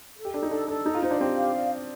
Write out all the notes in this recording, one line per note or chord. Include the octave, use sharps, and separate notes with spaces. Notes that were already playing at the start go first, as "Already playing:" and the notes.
A4
G4
D4 A4
D#4
D4 A4
D4 A4
D#4 A#5
F4
D#4 C5
D4
C4 G4
F5
D5
D5